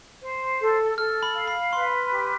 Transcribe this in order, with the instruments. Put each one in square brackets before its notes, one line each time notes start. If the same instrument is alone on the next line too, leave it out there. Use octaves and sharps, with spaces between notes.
[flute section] C5
A4
[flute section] A4 [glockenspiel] F6
[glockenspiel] B5
[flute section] F5
[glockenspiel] B5
[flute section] B4 [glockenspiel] C6
[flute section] G4